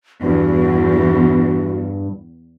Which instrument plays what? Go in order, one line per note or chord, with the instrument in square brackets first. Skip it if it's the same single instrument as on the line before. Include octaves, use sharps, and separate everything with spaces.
[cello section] E2 [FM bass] G2 [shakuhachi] F#4